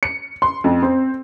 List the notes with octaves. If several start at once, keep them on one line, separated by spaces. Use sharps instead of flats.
C#7
C6
F2
C4